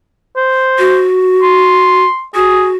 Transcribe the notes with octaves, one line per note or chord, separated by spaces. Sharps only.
C5
F#4
C6
F#4 G#4